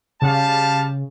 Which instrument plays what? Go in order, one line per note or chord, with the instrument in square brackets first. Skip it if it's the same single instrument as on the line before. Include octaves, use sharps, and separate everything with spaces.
[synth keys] C#3 [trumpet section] G3 F5 A5